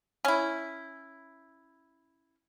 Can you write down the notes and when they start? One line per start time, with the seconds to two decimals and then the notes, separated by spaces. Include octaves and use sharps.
0.25 C#4 E4